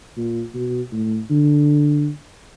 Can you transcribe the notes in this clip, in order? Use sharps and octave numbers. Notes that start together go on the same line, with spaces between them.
A#2
B2
A2
D3